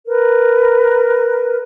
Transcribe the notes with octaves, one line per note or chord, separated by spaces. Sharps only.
A#4 B4